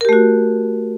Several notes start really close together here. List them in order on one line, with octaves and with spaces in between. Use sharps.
A#4 G4 A3 F#4